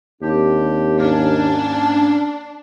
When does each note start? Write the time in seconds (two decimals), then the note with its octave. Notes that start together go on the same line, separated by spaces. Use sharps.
0.22 D#2 C4 D4 G4
0.99 G#2 A#3 C#4 D4